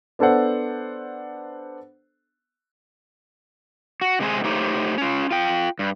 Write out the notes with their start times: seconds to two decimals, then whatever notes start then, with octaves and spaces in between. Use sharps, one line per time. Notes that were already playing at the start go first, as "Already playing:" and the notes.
0.19 B3 D4 A4 C5 F#5
4.01 F#4
4.20 C3 G#3 A3 C4 G#4
4.44 A3 D#4 G4 C5 C#5
4.98 C#4 F4
5.31 F4 G5
5.79 G2